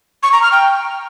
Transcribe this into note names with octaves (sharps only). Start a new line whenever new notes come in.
C#6
A#5
F6
G5